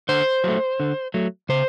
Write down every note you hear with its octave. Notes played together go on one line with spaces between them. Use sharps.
D3 C5
F#3 A3
D3
F#3 A3
C#3 C5